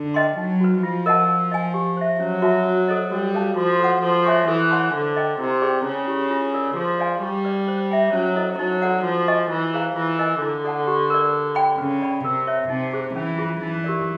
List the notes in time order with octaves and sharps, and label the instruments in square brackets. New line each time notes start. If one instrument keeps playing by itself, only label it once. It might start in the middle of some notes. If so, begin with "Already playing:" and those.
Already playing: [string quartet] D3
[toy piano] B4 D#5 G5 C6
[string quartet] F#3 [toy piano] D#4
[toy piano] F#4 B4
[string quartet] F3 [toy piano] F4
[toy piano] A#4 D#5 F#5 A5
A#4
D#5 G#5
G4
C5 E5
[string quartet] F#3 [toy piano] C#4
[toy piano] F#4 B4 E5 A5
F#4
A4 C5 D#5
[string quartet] G3 [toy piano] F#4
[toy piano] A4 C#5 F5 A5
[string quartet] F3 [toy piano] F#4
[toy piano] A4 C#5 F#5
[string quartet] F3 [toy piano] A4
[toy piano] C#5 E5 G#5 C#6
[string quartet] E3 [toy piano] A4
[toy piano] C#5 F#5 A5 C6
[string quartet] D3 [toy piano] C5
[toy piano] D#5 G5
[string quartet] C3 [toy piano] E4
[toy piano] G#4 B4 D5 G5
[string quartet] C#3 [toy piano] C#4
[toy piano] E4 G4
F4
A#4 D5
[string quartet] F3 [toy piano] G#4
[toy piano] B4 D5 F5 G#5
[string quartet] G3 [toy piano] G4
[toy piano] B4 D5
C5
E5 G5
[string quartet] F#3 [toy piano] C#4
[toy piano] E4 A4 C5 D#5
[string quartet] F#3 [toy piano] D#4
[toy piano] F#4 A4 D5 F#5
[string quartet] F3 [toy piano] B4
[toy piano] D#5 G#5 C#6
[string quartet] E3 [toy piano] F4
[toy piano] G#4 C5 F5 A#5
[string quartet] E3 [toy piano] F4
[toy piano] A#4 D#5 G#5
[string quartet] D3 [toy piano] E4
[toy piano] A4 D5 F#5 A5
G4
A#4 D5
B4
D5 G5 B5
[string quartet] C#3 [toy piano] B4
[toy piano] D5 G5 B5
[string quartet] C3 [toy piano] A#4
[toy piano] C#5 E5
[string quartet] C3 [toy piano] D#4
[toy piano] G#4 C5
[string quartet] E3 [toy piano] C#4
[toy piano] F4 G#4
[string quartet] E3 [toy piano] D#4
[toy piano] G4 A#4 D5